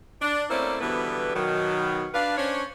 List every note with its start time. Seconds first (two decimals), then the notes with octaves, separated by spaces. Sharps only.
0.22 D4
0.50 A3 A#3 C4 C#4 E4 D5
0.81 B2 D3 E3 G3 B3 B4
1.34 B2 D#3 F#3
2.14 D4 B4 F5
2.37 C#4 D4 C5 C#5